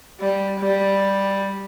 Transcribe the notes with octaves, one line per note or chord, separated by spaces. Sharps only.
G3
G3